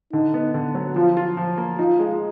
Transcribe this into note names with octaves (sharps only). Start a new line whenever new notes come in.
D3 D#4
B3
D3
F#3
F3 F4
F4
F3
A#3
D#4 F4
G#3